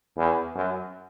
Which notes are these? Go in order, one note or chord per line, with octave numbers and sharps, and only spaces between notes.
E2
F#2